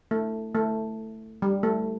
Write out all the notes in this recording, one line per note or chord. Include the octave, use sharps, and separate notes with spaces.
A3
A3
G3
A3